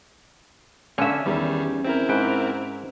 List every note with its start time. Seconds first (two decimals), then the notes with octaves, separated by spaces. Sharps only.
0.98 D3 C#4 E5
1.26 E2 D#3 G3
1.84 C4 E4 A#4
2.09 G#2 B4 G5